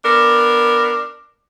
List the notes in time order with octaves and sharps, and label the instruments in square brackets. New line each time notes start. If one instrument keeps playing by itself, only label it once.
[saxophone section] B3 D4 A#4